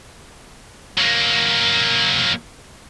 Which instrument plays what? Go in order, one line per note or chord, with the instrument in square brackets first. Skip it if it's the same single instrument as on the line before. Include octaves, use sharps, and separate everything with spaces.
[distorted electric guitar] F#3 A#3